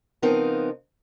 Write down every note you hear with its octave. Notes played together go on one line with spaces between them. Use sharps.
C#3 F3 B3 C4 D#4 A#4